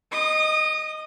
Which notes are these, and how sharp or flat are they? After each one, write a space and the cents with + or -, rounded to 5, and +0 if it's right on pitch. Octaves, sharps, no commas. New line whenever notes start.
D#5 +0 D#6 -30